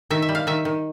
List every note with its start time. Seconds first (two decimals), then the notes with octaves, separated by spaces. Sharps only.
0.10 D#3 E5
0.22 E5
0.29 G3
0.35 F5
0.47 D#3 E5
0.65 D#3